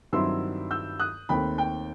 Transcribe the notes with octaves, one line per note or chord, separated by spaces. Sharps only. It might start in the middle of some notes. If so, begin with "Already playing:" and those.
G2 D#3 F#3 C4 E4 C6 E6
E6 G6
D#6 F#6
D#2 D#3 A3 C4 G5 B5
G5